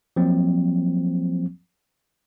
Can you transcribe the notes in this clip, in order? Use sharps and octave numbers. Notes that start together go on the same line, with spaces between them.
F3 F#3 A#3 C4